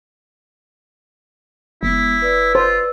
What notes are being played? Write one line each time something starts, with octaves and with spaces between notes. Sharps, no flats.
F#1 G#3 B3 E4
B4 D5 E6
F4 C5